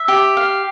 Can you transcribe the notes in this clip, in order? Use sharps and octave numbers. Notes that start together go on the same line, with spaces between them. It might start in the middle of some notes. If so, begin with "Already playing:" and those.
Already playing: E5
G4
F5